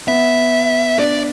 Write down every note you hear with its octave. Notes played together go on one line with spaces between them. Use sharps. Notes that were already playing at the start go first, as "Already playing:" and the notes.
B3 E5
D4 D5